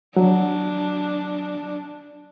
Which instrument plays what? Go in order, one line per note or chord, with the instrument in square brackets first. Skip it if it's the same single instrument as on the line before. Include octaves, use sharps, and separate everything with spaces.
[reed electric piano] F#3 [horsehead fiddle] D4